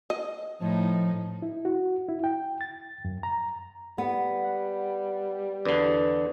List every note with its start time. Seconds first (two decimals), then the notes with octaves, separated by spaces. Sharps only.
0.10 D#5
0.61 A2 F3 D#4
1.42 E4
1.65 F#4
2.09 E4
2.24 G5
2.61 A6
3.05 F#2
3.23 A#5
3.98 G3 B3
4.44 F#5
5.65 E2 D3 D4 B4 D5